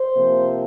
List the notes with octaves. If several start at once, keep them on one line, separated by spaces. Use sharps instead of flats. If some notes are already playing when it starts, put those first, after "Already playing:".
Already playing: C5
C3 F3 A#3